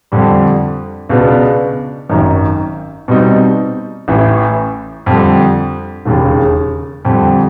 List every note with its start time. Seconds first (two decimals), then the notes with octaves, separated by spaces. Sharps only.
0.12 F2 D3 G3
1.10 C#2 B2 G#3 B3 D4
2.09 G#1 F#2 D#3
3.08 B2 G3 C4 D#4
4.08 A1 A2 E3
5.06 F2 D3 G3
6.05 E1 D#2 C#3
7.05 F2 D3 G3